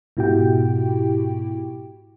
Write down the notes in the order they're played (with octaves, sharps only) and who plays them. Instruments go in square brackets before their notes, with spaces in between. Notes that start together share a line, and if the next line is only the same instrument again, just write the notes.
[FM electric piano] G#2 B2 E4 F#4 G4 G5